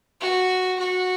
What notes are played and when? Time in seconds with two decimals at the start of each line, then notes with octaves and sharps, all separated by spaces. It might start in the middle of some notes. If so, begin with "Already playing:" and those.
0.21 F#4
0.80 F#4